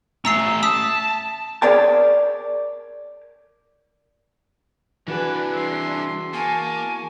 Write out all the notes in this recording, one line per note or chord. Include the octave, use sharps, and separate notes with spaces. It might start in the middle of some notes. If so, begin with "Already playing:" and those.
A3 C#4 A#5 E6 C7
A5 D#6 E6 B6
G#4 A#4 C#5 D5 G5 A5
C2 E3 D4 F#4 G#4 B4
E5 C6
A#3 G#5 A5 C#6